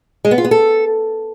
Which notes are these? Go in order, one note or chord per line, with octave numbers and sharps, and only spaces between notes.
G#3
B3
F4
B3
A4